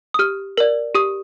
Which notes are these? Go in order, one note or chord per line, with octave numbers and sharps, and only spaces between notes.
D#6
G4 F6
A#4 D5
G4 D#6